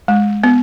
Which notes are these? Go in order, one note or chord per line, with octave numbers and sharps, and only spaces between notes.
G#3
B3